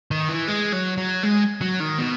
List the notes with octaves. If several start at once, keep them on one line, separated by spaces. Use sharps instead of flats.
D#3
E3
G#3
F#3
F#3
G#3
F#3
D#3
B2